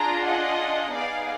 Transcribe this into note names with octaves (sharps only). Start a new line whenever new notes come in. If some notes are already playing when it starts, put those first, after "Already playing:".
Already playing: D4 F4 G#4 A#5
D#5 F#5
B3 D#4 G#4 D5 F5